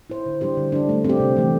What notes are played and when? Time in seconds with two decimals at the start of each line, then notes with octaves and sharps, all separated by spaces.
0.10 E4 C5
0.26 D3
0.41 G3 D4 G4 C5
0.57 D3
0.72 G3 D4
0.89 A3
1.04 C4 G4
1.20 C3
1.37 E3 A3